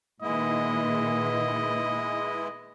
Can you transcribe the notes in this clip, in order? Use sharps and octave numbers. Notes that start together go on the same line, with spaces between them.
A#2 D#3 G#3 B3 E4 D#5